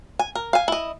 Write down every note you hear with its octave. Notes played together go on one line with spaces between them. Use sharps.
G#5
A#4
F5 G#5
E4 D#5